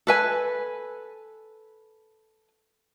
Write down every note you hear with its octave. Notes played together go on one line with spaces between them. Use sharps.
A4 B4 G#5